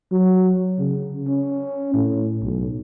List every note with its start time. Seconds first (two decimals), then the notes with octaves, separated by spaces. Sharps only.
0.12 F#3
0.79 C#3
1.28 C#4
1.94 A2
2.43 B1